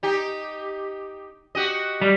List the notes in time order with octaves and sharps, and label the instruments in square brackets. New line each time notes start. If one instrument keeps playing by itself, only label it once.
[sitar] D#4 G4
F#4 G4 D#5
[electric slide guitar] G3